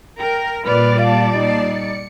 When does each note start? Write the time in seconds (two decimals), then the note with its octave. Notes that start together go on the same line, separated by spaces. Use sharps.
0.20 A#4 G5
0.65 A#2 G3 B4 D5 F6
1.01 F5 A5
1.34 A#2 D#4 A5 C7
1.66 C#7